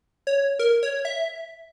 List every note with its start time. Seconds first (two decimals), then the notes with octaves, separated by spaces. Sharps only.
0.27 C#5
0.59 A#4
0.83 C#5
1.05 E5